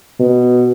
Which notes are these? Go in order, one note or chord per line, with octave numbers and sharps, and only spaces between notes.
B2